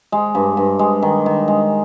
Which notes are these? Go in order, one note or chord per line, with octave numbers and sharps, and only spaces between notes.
G#3
G2
G2
G#3
D#3
D#3
G#3